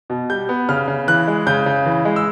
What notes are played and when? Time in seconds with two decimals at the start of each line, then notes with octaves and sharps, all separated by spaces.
0.10 B2
0.30 G3 G6
0.49 B3
0.69 C#3 F6
0.88 C#3
1.08 E3 F#6
1.27 G#3
1.47 C#3 G6
1.66 C#3
1.86 E3
2.05 G#3
2.16 E6